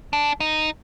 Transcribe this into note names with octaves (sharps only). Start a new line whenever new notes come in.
D4
D#4